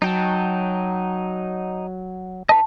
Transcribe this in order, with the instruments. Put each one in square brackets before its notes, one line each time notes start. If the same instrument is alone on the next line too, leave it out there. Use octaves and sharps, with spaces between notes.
[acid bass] F#3 [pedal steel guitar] D#4 G5 A5
[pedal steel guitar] D#4 B4 D#5 [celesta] A5